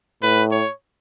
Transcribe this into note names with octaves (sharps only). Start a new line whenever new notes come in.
A2 B4
C#5